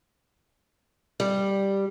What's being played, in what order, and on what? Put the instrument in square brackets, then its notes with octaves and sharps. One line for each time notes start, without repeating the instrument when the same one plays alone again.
[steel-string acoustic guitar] G3